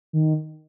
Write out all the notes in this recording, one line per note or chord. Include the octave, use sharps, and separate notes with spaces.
D#3